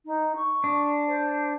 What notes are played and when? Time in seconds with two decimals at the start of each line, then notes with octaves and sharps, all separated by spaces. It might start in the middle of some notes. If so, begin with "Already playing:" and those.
0.05 D#4
0.36 C#6
0.64 D4
1.07 C5